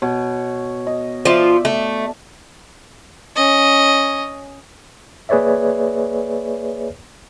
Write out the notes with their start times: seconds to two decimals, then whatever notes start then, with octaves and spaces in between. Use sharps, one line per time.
0.02 B2 C#5
0.87 D#5
1.25 F3 F4 D5 E5
1.65 A3
3.36 C#4 D#5
5.29 A#3 G#4 B4 C#5 D5 E5